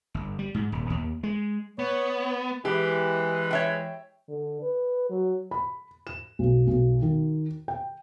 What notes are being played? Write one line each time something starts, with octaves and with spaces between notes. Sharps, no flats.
G1
G3
G#2
D#1
D#2
G#3
B3 C#5
E3 G#3 G4
C#5 E5 G5
D3
B4
F#3
B5
E7
B1
B1
D#3
G5